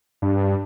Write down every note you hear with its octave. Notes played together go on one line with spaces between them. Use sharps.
G2